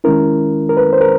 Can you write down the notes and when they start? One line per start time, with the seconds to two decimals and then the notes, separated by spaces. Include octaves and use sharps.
0.04 D#3 G#3 C#4 E4 A#4
0.69 A#4
0.77 B4
0.93 C5
1.01 A#4